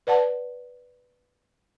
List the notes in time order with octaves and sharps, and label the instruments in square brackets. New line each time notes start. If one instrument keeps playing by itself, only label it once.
[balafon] B4 D5 F#5 A5